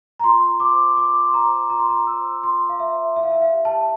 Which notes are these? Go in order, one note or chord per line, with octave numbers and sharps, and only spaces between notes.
A#5
F4 C6
C5 D6
F4 D6
C6
C5 A#5
F4 A#5
C6
A#5
C5 E6
F4 C6
F5
C5 E5
E4 E5
F5
E5
F5
G4
A5